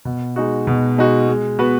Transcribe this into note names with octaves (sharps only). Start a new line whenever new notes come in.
B2
G#3 D#4 F#4
B2
G#3 D#4 F#4
G#3
B3 F#4 B4